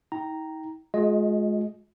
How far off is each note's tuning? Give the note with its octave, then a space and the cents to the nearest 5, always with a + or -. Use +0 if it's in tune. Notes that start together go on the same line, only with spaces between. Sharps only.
D#4 +45 G5 -10 A#5 +0
G#3 +25 F4 +45 D#5 +0